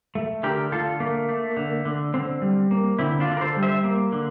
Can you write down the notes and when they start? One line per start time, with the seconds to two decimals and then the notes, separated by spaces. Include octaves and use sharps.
0.15 A3
0.43 D3 G4 A#4
0.72 D3 F4 A4
1.00 A3 A#3
1.29 A3
1.57 D3
1.85 D3
2.14 D3 C4
2.42 G3
2.71 A#3
2.99 D3 C4 E4
3.20 D4 F4
3.28 D3
3.37 A#4
3.41 A4 C5
3.57 G3
3.63 C5 E5
3.84 A#3
4.12 D3